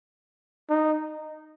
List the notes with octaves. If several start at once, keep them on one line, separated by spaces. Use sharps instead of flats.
D#4